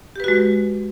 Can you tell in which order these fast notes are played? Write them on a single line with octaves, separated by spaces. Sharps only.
G4 B4 F#4 G#3